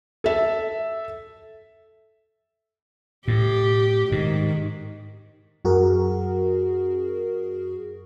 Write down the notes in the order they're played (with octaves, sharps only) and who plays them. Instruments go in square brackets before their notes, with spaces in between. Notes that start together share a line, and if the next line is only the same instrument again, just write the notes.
[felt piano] A4 E5
[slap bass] A2 [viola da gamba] G4
[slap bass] G#2 [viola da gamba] D#3
[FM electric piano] F#2 F#4 G#4 A#4